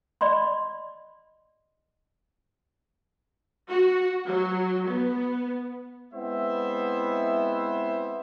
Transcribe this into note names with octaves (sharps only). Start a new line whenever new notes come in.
D5 D#5 B5 C6
F#4
F#3
B3
G#3 B3 C4 E4 C5 E5